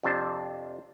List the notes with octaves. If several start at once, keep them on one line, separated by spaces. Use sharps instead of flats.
F2 C3 D4 C5 A5